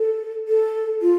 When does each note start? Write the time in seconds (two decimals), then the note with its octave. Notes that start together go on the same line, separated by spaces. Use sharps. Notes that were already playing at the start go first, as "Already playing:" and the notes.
Already playing: A4
0.48 A4
1.02 F4